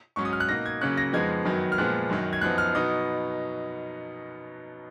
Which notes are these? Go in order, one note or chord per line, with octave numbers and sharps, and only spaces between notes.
G#2 F#3 C#4 C#6
D#6
F6
F#6
B2 A#3 D#4 A#6
G#6
C#3 F#3 A#3 C#4 F#6
A#6
F2 F3 G#3 B3 D#4 G#6
F#2 D#3 F#3 B3
F6
A#2 F3 G#3 B3 F#6
F#2 D#3 F#3
G#6
F#2 F3 B3 D#4 F#6
F6
B2 F#3 B3 D#4 D#6